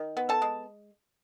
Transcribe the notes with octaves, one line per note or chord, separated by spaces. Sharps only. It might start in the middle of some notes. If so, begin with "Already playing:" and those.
Already playing: D#3
B3
A4 A5
G#3